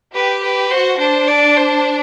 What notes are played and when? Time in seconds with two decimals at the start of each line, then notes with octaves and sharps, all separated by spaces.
0.14 G4 B4
0.43 B4
0.71 F#4 C5
1.00 D4 C5
1.28 D5
1.57 C5